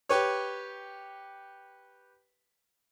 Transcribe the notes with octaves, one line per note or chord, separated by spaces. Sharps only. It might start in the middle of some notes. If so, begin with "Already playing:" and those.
G4 B4 C#5